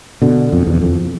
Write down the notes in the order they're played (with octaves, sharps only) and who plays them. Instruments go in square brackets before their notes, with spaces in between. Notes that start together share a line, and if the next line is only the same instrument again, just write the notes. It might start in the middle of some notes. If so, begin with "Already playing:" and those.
[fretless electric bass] B2 D3
F2
E2
F2